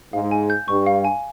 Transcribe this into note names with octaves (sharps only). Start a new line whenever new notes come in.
G#2 F5
G#5
G6
G2 C#6
F5
G#5